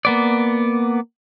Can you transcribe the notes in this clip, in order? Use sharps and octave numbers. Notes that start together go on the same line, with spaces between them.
A#3 B3 D5